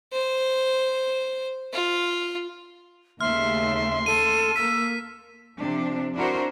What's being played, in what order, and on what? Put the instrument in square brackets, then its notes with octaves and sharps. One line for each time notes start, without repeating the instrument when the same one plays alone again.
[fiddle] C5
F4
[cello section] D#2 C#3 A3 [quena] E5 [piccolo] C6 [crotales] F6
[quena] A4 [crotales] D#7
[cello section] A#3 [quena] E6 [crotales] B6
[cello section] C3 F3 D4
D4 E4 F#4 A#4 C5